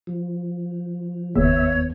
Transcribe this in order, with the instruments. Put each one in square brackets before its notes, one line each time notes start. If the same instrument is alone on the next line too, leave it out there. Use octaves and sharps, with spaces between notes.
[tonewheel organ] F3
[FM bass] F#1 [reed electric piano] D#2 B3 [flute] C#5 [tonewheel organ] E5